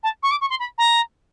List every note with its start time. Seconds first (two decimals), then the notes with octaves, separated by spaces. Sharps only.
0.03 A5
0.22 C#6
0.31 D6
0.41 C#6
0.50 C6
0.59 B5
0.78 A#5